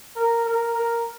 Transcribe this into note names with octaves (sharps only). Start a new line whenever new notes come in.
A#4
A#4
A#4